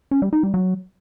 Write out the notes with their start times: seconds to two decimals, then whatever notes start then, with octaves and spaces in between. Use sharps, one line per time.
0.11 C#4
0.22 G3
0.33 D#4
0.43 G3
0.54 F#3